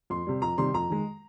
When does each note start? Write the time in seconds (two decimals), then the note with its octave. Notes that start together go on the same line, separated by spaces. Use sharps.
0.10 F2 C6
0.27 C3 G3
0.42 F2 A#5
0.58 C3 D#3 G3 C6
0.74 F2 A#5
0.90 D#3 G#3